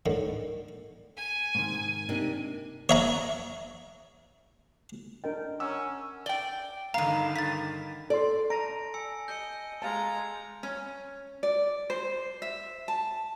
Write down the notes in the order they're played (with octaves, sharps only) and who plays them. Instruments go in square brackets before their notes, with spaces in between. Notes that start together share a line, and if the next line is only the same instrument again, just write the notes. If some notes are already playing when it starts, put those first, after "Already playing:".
[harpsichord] A2 D3 D#3
[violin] G#5
[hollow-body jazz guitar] G#2 C3 D#3
[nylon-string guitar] C3 A#3 D#4 [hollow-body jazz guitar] D4
[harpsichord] C#5 E5 A#5
[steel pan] D4 A#4 G5 [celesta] D#5
[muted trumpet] C#4 [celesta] F#5 A#5 [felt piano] E6
[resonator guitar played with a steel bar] D5 G5 [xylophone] G7
[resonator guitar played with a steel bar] G2 F5 [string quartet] D3 D#3 [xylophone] A#5
[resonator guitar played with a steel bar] G2 [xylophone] A6 B6
[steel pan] A4 C6 [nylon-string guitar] D5
[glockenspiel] A5 A#6 D7 [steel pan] A#5
[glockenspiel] G#5 E6 C#7
[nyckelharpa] D#5 [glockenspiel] G6 C#7
[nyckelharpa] G#3 A#5 [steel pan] F5 A5
[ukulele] C#4
D5
C5
E5
A5